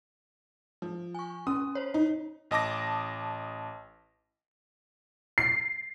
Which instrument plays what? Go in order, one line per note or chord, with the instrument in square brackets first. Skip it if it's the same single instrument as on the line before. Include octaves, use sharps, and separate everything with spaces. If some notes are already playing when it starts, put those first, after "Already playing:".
[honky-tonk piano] F3
[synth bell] G#5 C#6
[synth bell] C#4 [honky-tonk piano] D#6
[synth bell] C5 C#5
[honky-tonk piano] D#4
[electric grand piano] A1 D#5 A5 D6 A#6
[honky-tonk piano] C7